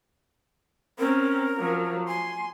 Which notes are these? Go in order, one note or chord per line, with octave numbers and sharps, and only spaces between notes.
C4 C#4 A#4
F3 F#3
G#5 C6